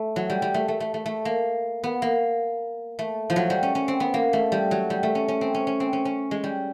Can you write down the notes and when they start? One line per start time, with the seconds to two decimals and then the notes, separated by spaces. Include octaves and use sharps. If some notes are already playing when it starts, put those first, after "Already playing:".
Already playing: A3
0.16 F#3
0.30 G3
0.42 G3
0.54 A3
0.68 A3
0.80 A3
0.94 A3
1.06 A3
1.25 A#3
1.84 B3
2.02 A#3
2.99 A3
3.30 F3
3.36 F#3
3.50 G3
3.63 C#4
3.75 C#4
3.88 C4
4.00 B3
4.14 A#3
4.33 A3
4.52 G3
4.71 F#3
4.90 G3
5.03 A3
5.15 C#4
5.28 C#4
5.41 C4
5.55 C#4
5.67 C#4
5.80 C4
5.93 C#4
6.05 C#4
6.31 G#3
6.44 G3